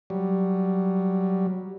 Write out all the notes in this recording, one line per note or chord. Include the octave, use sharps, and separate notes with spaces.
F#3 G3